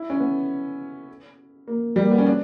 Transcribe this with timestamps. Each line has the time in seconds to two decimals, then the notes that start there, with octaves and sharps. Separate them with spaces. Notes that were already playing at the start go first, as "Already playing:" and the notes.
Already playing: E4
0.10 C#4
0.20 B3
1.68 A#3
1.96 G3
2.04 A#3
2.11 B3
2.18 C#4
2.26 D4